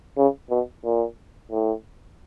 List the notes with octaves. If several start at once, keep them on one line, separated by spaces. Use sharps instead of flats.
C#3
B2
A#2
A2